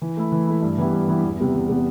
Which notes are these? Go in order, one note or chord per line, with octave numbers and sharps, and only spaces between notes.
E3
A3 E4
E3
A3 E4
G2
E3 B3 E4 G4
G2
E3 B3 E4 G4
E2
C3 G3 B3
E2
C3 G3 B3